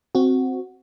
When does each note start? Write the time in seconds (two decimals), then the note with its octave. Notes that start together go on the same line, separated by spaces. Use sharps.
0.15 C4 F#4